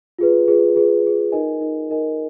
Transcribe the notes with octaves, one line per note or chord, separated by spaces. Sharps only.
F4 G#4 B4
F4 G#4 B4
F4 G#4 B4
F4 G#4 B4
D#4 A#4 D#5 G#5
D#4 A#4 D#5 G#5
D#4 A#4 D#5 G#5